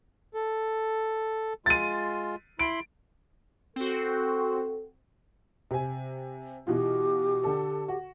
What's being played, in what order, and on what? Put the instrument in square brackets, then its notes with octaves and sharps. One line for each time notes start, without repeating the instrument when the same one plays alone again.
[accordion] A4
[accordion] G#3 F4 [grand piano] A6 D#7
[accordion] E4 B5 C6 [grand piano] D7
[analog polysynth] C4 F#4 [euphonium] A4
[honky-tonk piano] C3 G#5
[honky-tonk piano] B2 E3 F4 [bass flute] G4
[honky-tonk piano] D3 A4
F#4